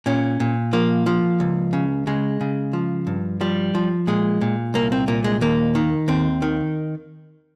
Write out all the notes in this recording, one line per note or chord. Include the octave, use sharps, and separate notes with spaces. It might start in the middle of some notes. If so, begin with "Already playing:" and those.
A#2 C#4
A#2
F3 A#3
F3
C#2
C#3
C#3 G#3
C#3
F3
G2
F3 G3
F3
A#2 G#3
A#2
C2 A#3
C4
A#2 A#3
G#3
D#2 A#3
D#3
D#2 C4
D#3